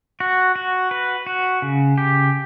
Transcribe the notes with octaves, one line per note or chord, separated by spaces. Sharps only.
F#4
F#4
B4
F#4
C#3
G4